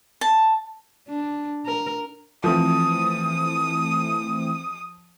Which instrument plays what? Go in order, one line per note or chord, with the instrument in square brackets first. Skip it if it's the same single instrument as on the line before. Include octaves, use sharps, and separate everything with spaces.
[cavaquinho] A5
[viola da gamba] D4
A#4
[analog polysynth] E3 A3 C4 [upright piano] F3 [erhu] D#6